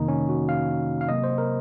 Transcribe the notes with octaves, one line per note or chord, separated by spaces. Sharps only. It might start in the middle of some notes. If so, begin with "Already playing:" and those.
Already playing: F2 C3 D#3 A#3 D#4
C#4
F#4
F5
F5
C3 F#3 A#3 D#5
C5
A#4